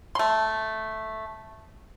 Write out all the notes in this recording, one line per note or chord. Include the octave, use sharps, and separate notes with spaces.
A3 C6